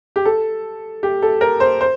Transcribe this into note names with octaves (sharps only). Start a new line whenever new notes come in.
G4
A4
G4
A4
A#4
C5
C5